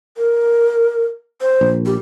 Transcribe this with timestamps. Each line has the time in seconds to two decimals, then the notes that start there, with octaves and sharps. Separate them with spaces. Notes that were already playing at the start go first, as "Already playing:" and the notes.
0.17 A#4
1.41 C5
1.61 A#1
1.86 G4